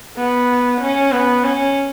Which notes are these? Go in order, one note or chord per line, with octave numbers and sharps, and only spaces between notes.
B3
C#4
B3
C#4